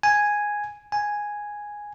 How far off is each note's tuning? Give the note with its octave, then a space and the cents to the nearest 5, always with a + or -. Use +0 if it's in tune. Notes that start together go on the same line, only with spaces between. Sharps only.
G#5 -5
G#5 -5